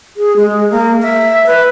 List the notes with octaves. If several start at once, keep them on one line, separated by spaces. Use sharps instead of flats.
G#4
G#3
A#3
E5
B4